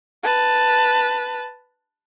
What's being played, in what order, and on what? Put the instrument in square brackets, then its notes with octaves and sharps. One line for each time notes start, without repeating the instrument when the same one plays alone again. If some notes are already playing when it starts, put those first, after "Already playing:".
[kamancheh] B4 A5